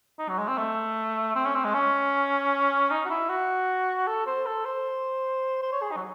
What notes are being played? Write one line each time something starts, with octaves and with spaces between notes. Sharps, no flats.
D#4
F#3
G#3
C4
A3
C4
C#4
C4
G#3
C#4
D#4
F#4
E4
F#4
A4
C5
A4
C5
C5
C#5
G#4
D#4
F#3